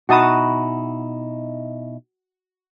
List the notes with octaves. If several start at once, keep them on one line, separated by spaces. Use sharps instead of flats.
B2 D#4 E4 F#4 A5 D#6